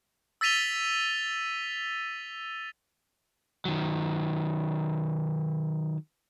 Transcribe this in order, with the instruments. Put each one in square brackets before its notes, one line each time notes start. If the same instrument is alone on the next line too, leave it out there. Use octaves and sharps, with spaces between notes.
[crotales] E6 A6 B6 D#7 F7 G7
[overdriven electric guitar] D#3 F#3